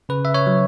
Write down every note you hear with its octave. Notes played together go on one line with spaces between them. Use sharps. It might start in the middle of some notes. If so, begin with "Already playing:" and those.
C#3 B4
E5
C#5
F#3